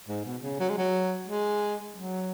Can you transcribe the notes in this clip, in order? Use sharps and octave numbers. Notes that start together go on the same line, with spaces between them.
G#2
B2
C#3
F#3
G#3
F#3
G#3
F#3